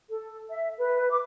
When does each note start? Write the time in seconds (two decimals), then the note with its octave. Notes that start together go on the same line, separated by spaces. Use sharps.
0.09 A4
0.50 E5
0.78 B4
1.10 D6